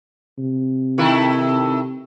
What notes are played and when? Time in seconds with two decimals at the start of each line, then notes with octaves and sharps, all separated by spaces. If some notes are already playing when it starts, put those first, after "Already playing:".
0.39 C3
0.98 D#3 A3 E4